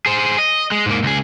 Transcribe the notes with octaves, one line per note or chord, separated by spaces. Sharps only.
G#4 C5
D#5
G#3
G#2 A#3
C#2 G#4